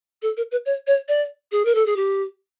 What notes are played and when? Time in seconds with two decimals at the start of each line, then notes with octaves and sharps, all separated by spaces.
0.22 A4
0.37 A#4
0.51 B4
0.66 C#5
0.87 C#5
1.08 D5
1.52 G#4
1.65 A#4
1.75 A4
1.86 G#4
1.96 G4